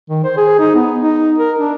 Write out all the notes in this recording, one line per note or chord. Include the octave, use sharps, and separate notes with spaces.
D#3
C5
G#4
D#4
B3
D#4
A#4
D4